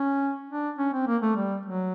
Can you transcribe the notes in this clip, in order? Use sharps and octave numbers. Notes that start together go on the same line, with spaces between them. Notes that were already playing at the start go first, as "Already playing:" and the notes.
Already playing: C#4
D4
C#4
C4
A#3
A3
G3
F#3